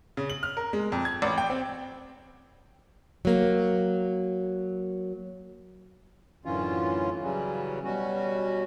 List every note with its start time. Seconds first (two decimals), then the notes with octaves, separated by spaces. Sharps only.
0.17 C#3
0.30 F#7
0.43 F6
0.57 A#4
0.73 G#3
0.92 F2
1.05 G#6
1.22 A1
1.38 G5
1.50 C4
3.25 F#3 A#3
6.45 F#2 A2 D3 E3 C#4 F4
7.23 C#3 E3 F#3 G3 C#4
7.84 B2 G3 C#4 F#4